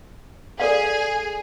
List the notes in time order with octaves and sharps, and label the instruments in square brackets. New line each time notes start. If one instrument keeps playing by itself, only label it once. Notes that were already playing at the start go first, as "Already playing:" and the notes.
[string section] G#4 [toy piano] A4 D5 F5